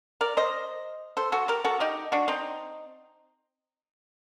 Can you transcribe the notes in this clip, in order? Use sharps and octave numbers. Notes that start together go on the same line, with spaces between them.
A#4 D5
C5 D#5
A4 C5
F#4 A4
G4 A#4
F#4 A4
D#4 G4
D4 F#4
C4 D#4